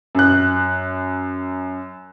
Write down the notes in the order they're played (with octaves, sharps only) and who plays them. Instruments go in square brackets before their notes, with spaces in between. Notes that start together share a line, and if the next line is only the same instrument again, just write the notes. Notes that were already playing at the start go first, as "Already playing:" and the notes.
[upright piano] F#2 F#6